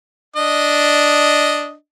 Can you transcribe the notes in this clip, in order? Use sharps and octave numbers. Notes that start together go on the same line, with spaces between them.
D4 D#5